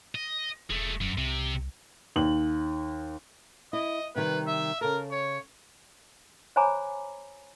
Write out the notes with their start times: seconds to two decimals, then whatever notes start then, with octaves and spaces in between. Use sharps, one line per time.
0.15 D#5
0.70 E1 G#3 A3
1.01 F#2
1.18 C2 C3
2.16 D#2 F#7
3.73 E4 D#5
4.16 C3 D#3 G3 B4
4.47 E5
4.81 C#3 A4 A#4
5.11 C#5
6.56 C5 C#5 G#5 A#5 B5 D6